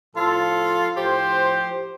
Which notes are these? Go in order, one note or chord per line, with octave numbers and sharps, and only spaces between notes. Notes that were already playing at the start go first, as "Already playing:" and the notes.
A2 F3 F4 A4
A2 F3 G4 C5